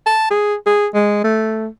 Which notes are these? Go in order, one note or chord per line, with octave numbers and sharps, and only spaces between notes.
A5
G#4
G#4
G#3
A3